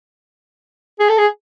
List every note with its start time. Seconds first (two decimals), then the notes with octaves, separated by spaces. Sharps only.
1.00 G#4
1.09 A4
1.18 G#4